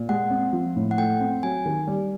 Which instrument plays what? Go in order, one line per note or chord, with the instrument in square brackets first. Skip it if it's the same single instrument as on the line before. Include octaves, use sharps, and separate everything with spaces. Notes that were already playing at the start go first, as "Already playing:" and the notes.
Already playing: [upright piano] A#2
[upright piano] G#3 [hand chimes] F#5
[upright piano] C4
F3
A2
[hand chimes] F#5
[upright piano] A3 [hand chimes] G5
[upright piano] C4
[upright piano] F#3 [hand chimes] G#5
[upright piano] D#3
G3